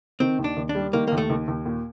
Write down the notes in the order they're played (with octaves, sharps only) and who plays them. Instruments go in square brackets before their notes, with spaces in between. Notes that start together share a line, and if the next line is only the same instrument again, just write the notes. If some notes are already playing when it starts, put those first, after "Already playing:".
[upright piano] D#3 [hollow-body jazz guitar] C4
[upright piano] D#2
[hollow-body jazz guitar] D4
[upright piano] D#2
[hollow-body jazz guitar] D4
[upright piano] G3
[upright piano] D#3 [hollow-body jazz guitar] A#3
[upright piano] D#2 [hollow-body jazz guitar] A#3
[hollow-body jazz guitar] A3
[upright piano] D#2
D#2
A#2